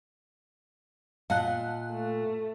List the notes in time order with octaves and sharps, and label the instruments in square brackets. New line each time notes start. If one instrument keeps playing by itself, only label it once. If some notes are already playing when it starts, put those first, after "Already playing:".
[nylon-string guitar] A#2 D#5 F#5 [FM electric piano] F5 A5 F#6
[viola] A3